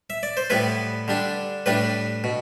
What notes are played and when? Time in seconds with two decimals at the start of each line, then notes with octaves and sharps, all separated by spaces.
0.10 E5
0.23 D5
0.37 C5
0.50 A2 G3 B3 E4 B4
1.08 D3 G3 D4
1.66 A2 G3 D4 B4
2.24 B2